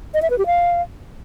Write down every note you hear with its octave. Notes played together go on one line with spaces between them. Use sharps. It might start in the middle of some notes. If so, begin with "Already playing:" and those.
D#5
E5
B4
G4
F5